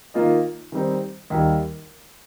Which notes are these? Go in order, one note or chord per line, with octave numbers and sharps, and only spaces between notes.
D#3 A#3 F4 D#5
D#3 G3 C4 D#4
D#2 D#3 G3